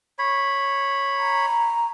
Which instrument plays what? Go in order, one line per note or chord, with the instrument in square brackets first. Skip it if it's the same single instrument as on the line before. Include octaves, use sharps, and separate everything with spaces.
[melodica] C#5 B5
[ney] A#5